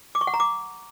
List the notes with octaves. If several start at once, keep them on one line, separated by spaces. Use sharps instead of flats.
D6
C#6
F#5
A#5
D6